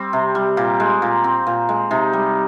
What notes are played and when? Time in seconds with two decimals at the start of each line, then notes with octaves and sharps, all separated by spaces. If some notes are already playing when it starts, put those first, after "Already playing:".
Already playing: G3 C4
0.13 C3
0.35 G3
0.57 A#2 G4
0.80 G#3
1.02 A#2
1.24 C4
1.47 A#2
1.69 G#3
1.91 C3 D#4
2.13 G3